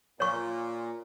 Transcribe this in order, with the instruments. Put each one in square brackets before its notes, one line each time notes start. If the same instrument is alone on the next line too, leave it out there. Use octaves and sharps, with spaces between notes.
[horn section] A#2 [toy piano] C#5 C#6